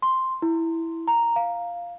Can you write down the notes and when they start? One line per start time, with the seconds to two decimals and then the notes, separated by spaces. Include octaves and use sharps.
0.02 C6
0.42 E4
1.08 A#5
1.36 F5